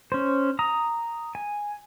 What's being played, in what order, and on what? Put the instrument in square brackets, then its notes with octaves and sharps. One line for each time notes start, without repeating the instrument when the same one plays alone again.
[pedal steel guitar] C#4 C5
A#5 D#6
G#5